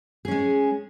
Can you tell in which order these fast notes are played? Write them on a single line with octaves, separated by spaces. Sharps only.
G#4 C#4 G#3